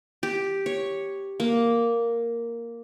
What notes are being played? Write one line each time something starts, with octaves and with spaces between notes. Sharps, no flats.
G4
C#5
A#3